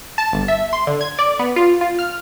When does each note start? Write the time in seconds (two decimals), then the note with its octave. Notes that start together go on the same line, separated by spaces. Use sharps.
0.18 A5
0.33 G1
0.48 E5
0.73 C6
0.87 D3
1.01 G#6
1.19 D5
1.39 B3
1.56 F4
1.81 F4
1.99 F6